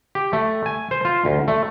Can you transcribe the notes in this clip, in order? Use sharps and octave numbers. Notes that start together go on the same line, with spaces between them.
G4
A3
G#5
C5
F4
D2
A3